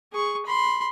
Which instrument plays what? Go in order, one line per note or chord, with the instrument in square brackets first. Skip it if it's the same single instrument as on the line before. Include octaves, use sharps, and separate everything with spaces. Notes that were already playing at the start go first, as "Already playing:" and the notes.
[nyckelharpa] G#4 C#6
B5 C6